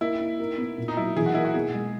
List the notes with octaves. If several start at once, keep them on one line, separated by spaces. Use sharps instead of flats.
A#3 E4
D#4
A#4
B3
A#2
D#4
F#3 E4
E3 G#4
F#4
A#3 E4
F#4
B2 G#4
G#3